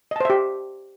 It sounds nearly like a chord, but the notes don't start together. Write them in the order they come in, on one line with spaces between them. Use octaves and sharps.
D#5 A5 C5 E5 G4